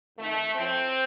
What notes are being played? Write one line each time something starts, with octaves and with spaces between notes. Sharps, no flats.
F2 D#3 A3
A2 F3 C4